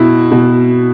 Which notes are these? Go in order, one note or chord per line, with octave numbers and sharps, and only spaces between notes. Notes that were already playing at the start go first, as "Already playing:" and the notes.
Already playing: B2 E4
B2